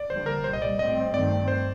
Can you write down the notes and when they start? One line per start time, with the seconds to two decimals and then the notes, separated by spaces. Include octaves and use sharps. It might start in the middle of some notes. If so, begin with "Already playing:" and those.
Already playing: D5
0.10 D#2 D3 G3 C5
0.26 A#4
0.44 C2 A#2 G3 C5
0.53 D#5
0.62 D5
0.79 A2 G3 C4 D#5
1.13 G2 D#3 A3 C4 D5
1.48 C5